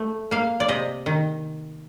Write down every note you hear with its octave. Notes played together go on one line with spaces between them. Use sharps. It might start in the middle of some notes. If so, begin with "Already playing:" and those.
Already playing: A3
A#3 F5
D5
C3 D#5
D#3